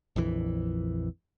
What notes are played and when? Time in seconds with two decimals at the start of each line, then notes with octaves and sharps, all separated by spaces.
0.16 A#1 F2 E3